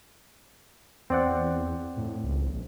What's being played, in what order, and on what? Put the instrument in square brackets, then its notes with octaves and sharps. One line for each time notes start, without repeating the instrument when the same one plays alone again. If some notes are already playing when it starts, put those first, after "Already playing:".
[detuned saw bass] E2 [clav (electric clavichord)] C4 D5 F#5
[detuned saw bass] A2
C#2
A#1